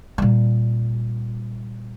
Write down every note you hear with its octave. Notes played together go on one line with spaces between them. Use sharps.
A#2 G3